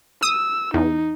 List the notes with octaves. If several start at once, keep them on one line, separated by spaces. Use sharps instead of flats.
D#6 E6
E2 D#4